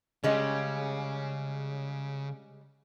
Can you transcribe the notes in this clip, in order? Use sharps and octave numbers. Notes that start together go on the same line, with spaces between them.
C#3 G3 G#3 C#4